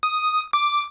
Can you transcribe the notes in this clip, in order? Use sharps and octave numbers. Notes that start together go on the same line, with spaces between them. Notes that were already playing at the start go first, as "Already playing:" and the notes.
D#6
D6